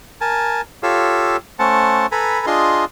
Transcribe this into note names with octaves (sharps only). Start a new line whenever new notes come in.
A#4 G#5 A5
F4 G4 A4 C#5 F5 E6
A3 C#4 C5 F#5 A5
A4 B4 G#5 A#5 B5
D4 F4 G#4 D#5 C6